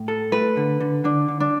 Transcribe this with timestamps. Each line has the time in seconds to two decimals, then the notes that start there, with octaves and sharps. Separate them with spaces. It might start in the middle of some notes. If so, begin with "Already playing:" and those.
Already playing: A2
0.08 A4
0.32 A3 B4
0.57 D3
0.80 D3
1.04 D3 D4
1.28 D3
1.40 D4